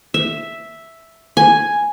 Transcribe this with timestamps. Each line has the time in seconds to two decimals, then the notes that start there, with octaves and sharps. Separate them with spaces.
0.14 E5
1.37 G#5